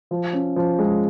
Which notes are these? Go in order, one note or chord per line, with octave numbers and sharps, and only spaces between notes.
F3
C#4
F3
G#3